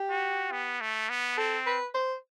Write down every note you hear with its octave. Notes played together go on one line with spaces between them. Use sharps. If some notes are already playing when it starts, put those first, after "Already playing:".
Already playing: G4
F#4
B3
A3
B3
C4 A4
B4
C5